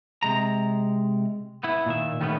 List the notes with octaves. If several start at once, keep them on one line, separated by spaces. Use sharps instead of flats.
C3 G#3 A#5
B3 E4
A#2 D#3 E5
D#3 G3 A3 B3 C#4